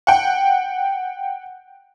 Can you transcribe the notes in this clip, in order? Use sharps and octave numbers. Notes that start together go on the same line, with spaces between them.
F#5 G5